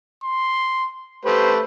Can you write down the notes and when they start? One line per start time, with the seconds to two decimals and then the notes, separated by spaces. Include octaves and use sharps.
0.23 C6
1.25 A3 G4 B4 C5